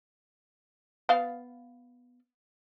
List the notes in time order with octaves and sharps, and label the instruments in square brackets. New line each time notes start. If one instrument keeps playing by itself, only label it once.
[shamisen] B3 F5